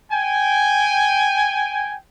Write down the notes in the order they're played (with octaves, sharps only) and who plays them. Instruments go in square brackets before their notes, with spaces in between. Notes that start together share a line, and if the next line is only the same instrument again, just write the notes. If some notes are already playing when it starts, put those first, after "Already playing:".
[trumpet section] G5 G#5